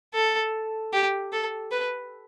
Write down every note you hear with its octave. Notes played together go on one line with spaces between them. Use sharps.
A4
G4
A4
B4